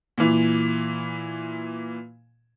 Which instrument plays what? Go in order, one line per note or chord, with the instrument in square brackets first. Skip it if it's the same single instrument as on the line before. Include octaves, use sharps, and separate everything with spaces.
[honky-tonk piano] A#2 E3